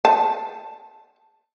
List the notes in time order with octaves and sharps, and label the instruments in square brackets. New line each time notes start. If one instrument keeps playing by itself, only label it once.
[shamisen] A5